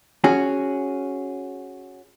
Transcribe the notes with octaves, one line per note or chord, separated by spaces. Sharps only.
C#4 F#4 G#4